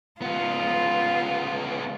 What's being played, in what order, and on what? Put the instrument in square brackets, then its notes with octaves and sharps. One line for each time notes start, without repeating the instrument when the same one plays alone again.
[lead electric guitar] C#2 B3 [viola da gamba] F4